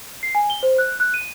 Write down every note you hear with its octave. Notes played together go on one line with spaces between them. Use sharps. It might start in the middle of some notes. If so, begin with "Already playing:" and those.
C7
G#5
G7
C5
F#6
F#6
D#7